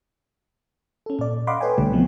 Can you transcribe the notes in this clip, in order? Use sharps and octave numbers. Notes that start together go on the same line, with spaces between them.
C#4 A4
A#2 D5
D#5 F5 F#5 B5 C6 D6
A4 B4 C#5 G5 G#5
B1 B2 D3 G3 A3
B2 E3 F3 A3 B3 C4